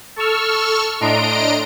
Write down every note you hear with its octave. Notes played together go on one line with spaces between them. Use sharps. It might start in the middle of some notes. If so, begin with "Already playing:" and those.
A4 C#6 E6 F6
A2 D4 D#5 A#5 C6 D7